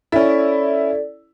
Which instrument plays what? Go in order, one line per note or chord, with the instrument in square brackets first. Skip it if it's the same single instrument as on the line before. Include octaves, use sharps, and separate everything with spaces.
[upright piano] C#4 E4 [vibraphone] A4 D5